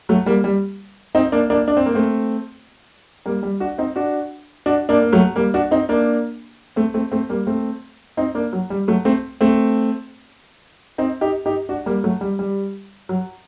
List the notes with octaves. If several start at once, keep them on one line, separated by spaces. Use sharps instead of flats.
F#3 A3
G3 A#3
G3
C4 D#4
A#3 D4
A#3 D4
D4
C4
A#3
A3 C4
G3 A#3
G3
D4 F#4
C4 D#4
D4 F#4
D4 F#4
A#3 D4
A#3
F#3 A3
G3 A#3
D4 F#4
C4 D#4
A#3 D4
A3 C4
A3 C4
A3 C4
G3 A#3
A3 C4
C4 D#4
A#3 D4
F#3
G3
F#3 A3
A3 C4
A3 C4
C4 D#4
D#4 G4
D#4 G4
D4 F#4
G3 A#3
F#3 A3
G3
G3
F#3